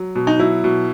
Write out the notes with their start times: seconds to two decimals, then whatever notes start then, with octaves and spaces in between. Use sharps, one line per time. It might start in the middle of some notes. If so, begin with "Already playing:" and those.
Already playing: F#3
0.15 B2
0.27 D#4
0.39 F#3 E4
0.64 B2